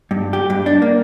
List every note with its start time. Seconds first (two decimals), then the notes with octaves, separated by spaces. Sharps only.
0.11 G2
0.33 G4
0.50 G2
0.66 D4
0.82 A#3